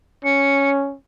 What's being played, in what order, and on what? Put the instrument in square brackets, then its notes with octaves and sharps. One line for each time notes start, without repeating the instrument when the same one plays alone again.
[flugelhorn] C#4 [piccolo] C#7